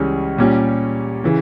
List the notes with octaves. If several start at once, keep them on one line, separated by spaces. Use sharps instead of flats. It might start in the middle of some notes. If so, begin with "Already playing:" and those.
Already playing: C#2 C#3 E3 G3 C#4
A#2 G3 C#4 G4
C#3 E3